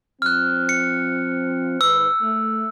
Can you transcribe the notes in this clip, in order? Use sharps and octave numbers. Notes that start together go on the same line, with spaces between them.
F3 C4 F6 F#6
C#7
G#2 D#3 B4 E6
A3